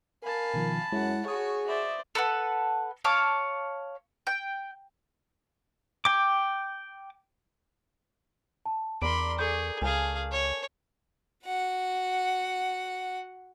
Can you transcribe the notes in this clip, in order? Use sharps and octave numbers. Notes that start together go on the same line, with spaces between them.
A#4 F5 G#5 A5 B5
B2 D#3 F3
F#2 G#3 E4 C#5 F#5
F#4 G#4 C#5 C#6 D#6
C5 D5 E5
A4 B4 F#5
C#5 F5 A5 D6
G5
G5 D6
A5
E2 A#4 D5 B5 C6 D7
G#4 A4 C#6 G6
C#2 G#4 F5 G#5 A5
C#5
F#4 F#5